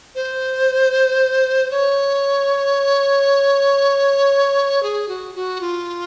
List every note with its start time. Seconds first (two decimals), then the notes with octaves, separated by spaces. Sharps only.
0.15 C5
1.71 C#5
4.83 G#4
5.08 F#4
5.35 F#4
5.61 F4